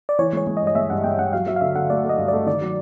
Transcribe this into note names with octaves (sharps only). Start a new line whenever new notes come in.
D5
E3 C#5
G#3 C#5
G#3
D#5
G2
D#5
G#3 E5
G2 F#5
G#3 G5
G2 F#5
F#3 F5
F#3 E5
F5
D3 E5
D3 F#5
A3 D5
A3
D#5
G2
A3 D5
D#3 D5
F#3